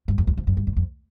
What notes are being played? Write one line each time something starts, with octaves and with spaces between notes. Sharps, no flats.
G2
F2
E2
F2
F#2
G2
F#2
F2